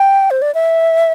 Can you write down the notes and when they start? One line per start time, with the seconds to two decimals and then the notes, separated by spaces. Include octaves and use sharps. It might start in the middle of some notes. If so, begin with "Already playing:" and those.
Already playing: G5
0.31 C5
0.42 D5
0.54 E5